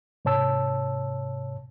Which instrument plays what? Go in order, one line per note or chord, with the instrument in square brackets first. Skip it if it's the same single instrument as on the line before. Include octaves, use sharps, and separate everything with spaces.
[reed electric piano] G#2 C3 C#5 A5 E6